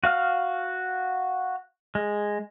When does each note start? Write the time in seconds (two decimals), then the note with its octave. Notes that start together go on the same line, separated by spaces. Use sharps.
0.04 F#4 F5 F6
1.95 G#3